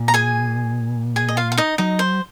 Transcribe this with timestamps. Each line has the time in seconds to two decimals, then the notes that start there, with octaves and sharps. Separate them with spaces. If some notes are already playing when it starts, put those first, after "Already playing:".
Already playing: A#2
0.08 A#5
0.14 G#4 G#5
1.16 G#4 G#5
1.28 D#5
1.37 F4 F5
1.52 F5
1.57 D#4 D#5
1.78 F#3 D#4 D#5
1.99 C5